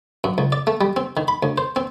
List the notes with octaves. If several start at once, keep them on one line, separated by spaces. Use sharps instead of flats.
F#2
C#2
D5
A3
G3
C4
D#3
B5
D2
C5
C4